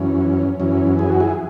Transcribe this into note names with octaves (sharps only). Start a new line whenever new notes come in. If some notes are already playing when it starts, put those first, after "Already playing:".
Already playing: F#2 E3 C#4
F#2 E3 C#4
G#4
F#4
E4 G#4